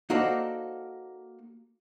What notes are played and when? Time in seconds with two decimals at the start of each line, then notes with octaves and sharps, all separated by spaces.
0.10 A#3 D#4 F#4 A4 C5 D5